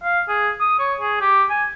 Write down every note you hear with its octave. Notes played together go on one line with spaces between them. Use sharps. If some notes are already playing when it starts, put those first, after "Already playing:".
F5
G#4
D#6
C#5
G#4
G4
G#5